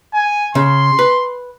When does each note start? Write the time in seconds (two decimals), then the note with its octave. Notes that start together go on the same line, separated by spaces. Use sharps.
0.14 G#5
0.55 C#3 C6
0.99 B4